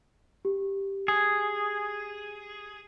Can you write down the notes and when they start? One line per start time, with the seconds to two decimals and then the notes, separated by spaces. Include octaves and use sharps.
0.45 G4
1.08 G#4